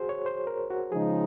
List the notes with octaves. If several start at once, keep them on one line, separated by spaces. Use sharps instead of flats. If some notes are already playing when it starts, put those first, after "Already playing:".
Already playing: F#4 G#4 C5
C#5
C5
A#4
F#4
C#3 F3 G#3 D#4 G#4